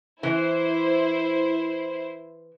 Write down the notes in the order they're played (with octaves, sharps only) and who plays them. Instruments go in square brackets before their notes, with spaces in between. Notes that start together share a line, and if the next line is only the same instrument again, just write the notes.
[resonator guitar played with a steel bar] E3 [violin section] E4 C5